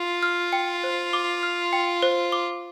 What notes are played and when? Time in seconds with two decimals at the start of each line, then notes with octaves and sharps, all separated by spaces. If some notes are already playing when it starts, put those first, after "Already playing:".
Already playing: F4
0.23 F6
0.53 G5
0.84 C5
1.13 D6
1.43 F6
1.73 G5
2.03 C5
2.32 D6